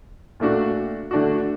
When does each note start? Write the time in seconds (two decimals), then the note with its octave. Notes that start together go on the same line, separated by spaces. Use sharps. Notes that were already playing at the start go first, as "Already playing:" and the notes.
0.40 A#2 A3 D4 F#4
1.11 D3 A3 D4 F#4